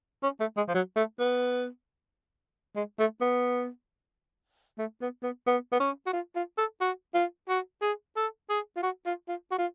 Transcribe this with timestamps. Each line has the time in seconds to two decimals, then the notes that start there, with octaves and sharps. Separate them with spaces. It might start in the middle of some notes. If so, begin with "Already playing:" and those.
0.23 C#4
0.40 A3
0.57 G#3
0.68 F3
0.74 F#3
0.96 A3
1.19 B3
2.76 G#3
2.99 A3
3.21 B3
4.78 A3
5.01 B3
5.23 B3
5.47 B3
5.72 B3
5.80 C#4
6.06 F#4
6.13 F4
6.35 F4
6.58 A4
6.81 F#4
7.14 F4
7.49 F#4
7.81 G#4
8.16 A4
8.49 G#4
8.76 F4
8.83 F#4
9.06 F4
9.28 F4
9.51 F#4
9.58 F4